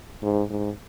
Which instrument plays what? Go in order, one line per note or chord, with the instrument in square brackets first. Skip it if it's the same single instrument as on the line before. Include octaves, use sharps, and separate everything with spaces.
[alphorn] G#2
G#2